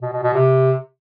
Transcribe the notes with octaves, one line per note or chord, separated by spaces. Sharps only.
B2
B2
B2
C3